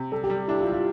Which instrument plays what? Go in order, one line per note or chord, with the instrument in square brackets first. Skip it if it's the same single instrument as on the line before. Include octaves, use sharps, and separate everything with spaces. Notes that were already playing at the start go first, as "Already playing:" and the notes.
Already playing: [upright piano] C3
[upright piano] G3 [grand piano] A4
[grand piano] G4
[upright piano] G3
[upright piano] D4 [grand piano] E4
[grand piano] F4
[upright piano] G3
[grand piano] F4